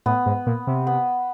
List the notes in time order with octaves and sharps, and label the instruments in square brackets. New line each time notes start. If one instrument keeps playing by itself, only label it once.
[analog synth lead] A2 [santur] B3
[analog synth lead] G#2
A#2
C3
[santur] B3